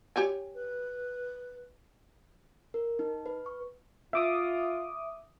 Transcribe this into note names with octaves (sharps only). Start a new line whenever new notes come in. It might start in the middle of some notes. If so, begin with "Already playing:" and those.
G4 C#5 G#5
B4
A#4
D#4
B4
C#6
F4 E5 D6 D#6